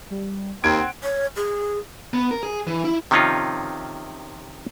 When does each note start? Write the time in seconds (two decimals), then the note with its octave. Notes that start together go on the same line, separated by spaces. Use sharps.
0.10 G3
0.64 D#2 C4 F5 G#6 D7
0.80 F#5
1.03 C#5
1.36 G#4
2.14 B3
2.31 A#4
2.43 G#4
2.67 E3
2.84 E4
3.11 C3 D#3 F3 C#4 D#4 F4